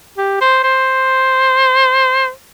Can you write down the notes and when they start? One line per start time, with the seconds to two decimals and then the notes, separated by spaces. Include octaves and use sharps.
0.18 G4
0.41 C5
0.63 C5